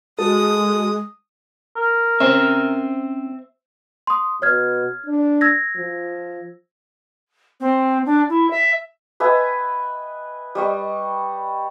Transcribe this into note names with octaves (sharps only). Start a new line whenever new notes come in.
G#3 F#4 A4 D#6
A#4
C4 C#4 C5 E5
C6 D#6
B2 C#5 F6 G#6
D4
E6 G#6 A#6
F3
C4
D4
E4
E5
B4 D#5 E5 G#5
G3 D#5 C#6